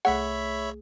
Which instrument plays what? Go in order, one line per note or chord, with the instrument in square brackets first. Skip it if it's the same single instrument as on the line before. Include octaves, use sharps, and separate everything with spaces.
[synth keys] C2 A3 G#4 [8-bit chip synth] C#5 E5 B5 [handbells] F#5